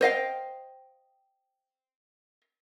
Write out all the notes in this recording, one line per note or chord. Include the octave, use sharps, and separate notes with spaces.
C5 D#5 F5 G5